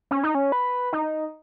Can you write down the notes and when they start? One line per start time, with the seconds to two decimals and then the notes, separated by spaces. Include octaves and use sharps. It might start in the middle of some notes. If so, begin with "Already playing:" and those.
0.11 C#4
0.23 D#4
0.35 C#4
0.52 B4
0.93 D#4